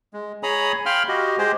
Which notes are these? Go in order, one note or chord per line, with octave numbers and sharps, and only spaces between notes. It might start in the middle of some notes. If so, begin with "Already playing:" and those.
G#3
G#4 C#5 G#5 A#5 B5 D#6
F5 G5 B5 C6 F6
F#4 G4 D#5
G#3 G4 G#4 C5 D#5